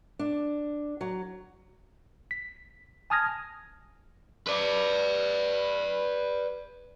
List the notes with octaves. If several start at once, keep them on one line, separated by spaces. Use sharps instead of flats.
D4
F#3
B6
G#5 A5 D#6 F6 G#6 A#6
B4 D5